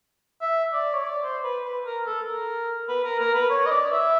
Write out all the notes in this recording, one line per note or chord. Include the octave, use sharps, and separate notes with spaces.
E5
D5
C#5
D5
C5
B4
B4
A#4
A4
A#4
B4
A#4
A#4
B4
C#5
D#5
D5
E5